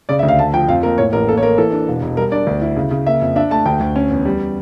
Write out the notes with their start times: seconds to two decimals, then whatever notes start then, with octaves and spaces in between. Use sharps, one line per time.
0.09 C#3 D5
0.19 E5
0.23 D2
0.28 F5
0.39 A3 A5
0.53 F3 G5
0.69 F2 F5
0.83 A#3 A#4
0.98 A2 C#5
1.12 A1 A#4
1.28 A#3 A4
1.38 C#5
1.43 A#3 A#4
1.58 E3 A4
1.72 D4
1.88 E1
2.02 E1
2.17 G3 A#4
2.32 D4 D5
2.47 D2
2.62 E4
2.77 C#3
2.91 C#3
3.06 A#3 E5
3.21 F2
3.36 D4 E5
3.51 A3 A5
3.66 D2 G5
3.81 D2
3.96 C#4
4.10 E2
4.25 G3